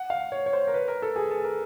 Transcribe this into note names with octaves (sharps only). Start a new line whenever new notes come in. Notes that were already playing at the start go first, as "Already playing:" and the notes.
Already playing: F#5
F5
C#5
C#5
C5
A#4
B4
A#4
A4
G#4
A4
A#4